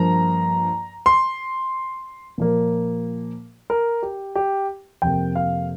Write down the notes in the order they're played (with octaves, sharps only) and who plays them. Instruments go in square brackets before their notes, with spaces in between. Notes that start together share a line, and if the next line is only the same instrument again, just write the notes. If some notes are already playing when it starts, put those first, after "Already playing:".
Already playing: [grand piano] G2 F3 A#3 A#5
C6
A#2 F3 A#3
A#4
G4
G4
F2 C3 A#3 G5
F5